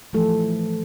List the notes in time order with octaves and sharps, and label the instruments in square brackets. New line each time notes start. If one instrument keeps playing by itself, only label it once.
[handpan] E3 F3 A3 A4